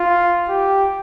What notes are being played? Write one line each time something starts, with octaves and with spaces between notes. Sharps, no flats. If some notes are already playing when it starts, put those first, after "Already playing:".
Already playing: F4
G4